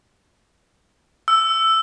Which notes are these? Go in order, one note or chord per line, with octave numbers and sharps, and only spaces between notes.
E6